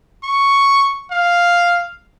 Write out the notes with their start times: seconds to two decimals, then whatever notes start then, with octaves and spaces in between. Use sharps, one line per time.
0.24 C#6
1.11 F5